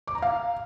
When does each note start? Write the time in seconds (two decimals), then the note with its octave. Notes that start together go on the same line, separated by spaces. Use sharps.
0.07 D6
0.15 A#5
0.22 F5